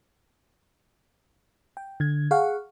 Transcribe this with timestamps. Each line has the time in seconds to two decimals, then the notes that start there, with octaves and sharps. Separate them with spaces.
1.77 G5
2.00 D3 G#6
2.31 G#4 F5 F#5 C#6